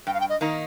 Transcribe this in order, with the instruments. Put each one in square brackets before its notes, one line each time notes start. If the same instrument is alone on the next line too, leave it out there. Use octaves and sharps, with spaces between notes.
[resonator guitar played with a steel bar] G2 [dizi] G5
[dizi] F5
G5
D#5
[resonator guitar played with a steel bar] D#3 A#3 D#4